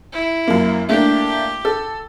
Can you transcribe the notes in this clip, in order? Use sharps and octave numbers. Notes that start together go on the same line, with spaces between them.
E4
F#2 A#3
A3 A#3 D4 G4
A4